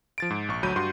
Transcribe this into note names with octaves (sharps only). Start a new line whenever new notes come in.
F3 A6 D7
G#2
A#1 C#6
D2 F#3 B5 G6 D#7
G2 F#4 C6